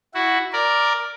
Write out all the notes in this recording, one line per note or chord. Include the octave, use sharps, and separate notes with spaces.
E4 F#4
A#4 D5